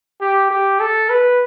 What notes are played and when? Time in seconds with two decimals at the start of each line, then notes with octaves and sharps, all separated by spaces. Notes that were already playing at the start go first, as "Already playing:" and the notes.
0.21 G4
0.51 G4
0.80 A4
1.10 B4